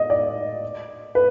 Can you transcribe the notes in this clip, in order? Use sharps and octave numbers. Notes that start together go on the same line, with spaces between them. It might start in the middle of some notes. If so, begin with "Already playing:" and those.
Already playing: D#5
D5
B4